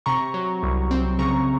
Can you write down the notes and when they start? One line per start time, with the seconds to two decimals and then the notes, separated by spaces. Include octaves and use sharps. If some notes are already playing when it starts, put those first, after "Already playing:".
0.06 C3 A#5 C#6
0.34 F#3
0.63 C2
0.91 C4
1.19 C#3 A#5 C#6